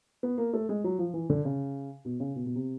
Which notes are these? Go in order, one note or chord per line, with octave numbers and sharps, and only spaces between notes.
B3
A#3
A3
G#3
F#3
F3
E3
D3
C#3
B2
C#3
B2
B2
C3